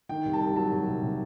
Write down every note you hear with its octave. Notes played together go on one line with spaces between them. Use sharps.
D#3 G5
C2
A5
C2
F#3 A5
C2
C3
C3